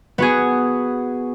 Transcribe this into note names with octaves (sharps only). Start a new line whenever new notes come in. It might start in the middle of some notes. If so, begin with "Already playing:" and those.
B3 F#4 G#4